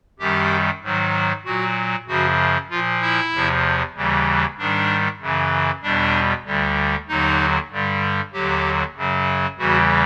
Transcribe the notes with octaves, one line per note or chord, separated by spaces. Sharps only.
F#2 D#3 G3 G4
G#2 D#3 F#3
A#2 F#3 F#4
F#2 C#3 F3 F#4
A#2 F3 F4
E4
E2 C3 F3
D#2 C#3 E3 G3
G#2 D#3 G3 D4
F#2 C#3 E3
E2 B2 G3 D4
D2 D3 G3
D#2 D3 F#3 D#4
G2 D3 G3
D#2 D3 F#3 G4
F#2 C#3 F#3
E2 C#3 E3 G3 F#4